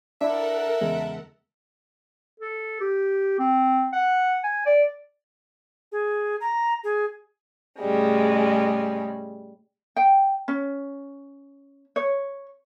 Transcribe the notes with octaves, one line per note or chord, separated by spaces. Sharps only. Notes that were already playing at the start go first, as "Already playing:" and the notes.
D4 E4 A4 A#4 E5 F#5
E2 C#3 G#3
A4
G4
C4
F#5
G#5
D5
G#4
A#5
G#4
A2 C#3 G3 G#3
G5
C#4
C#5